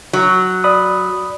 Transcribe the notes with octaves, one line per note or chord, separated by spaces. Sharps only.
F#3
D5 B5 D#6